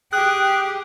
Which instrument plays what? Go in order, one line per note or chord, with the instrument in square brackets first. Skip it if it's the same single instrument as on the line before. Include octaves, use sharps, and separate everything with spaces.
[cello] G4 [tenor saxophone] G#4 [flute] G5 [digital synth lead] F#6